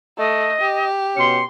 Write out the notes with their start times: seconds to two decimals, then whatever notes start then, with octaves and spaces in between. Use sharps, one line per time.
0.18 A3 D#5
0.61 G4
1.16 B2 C#4 C6 C#7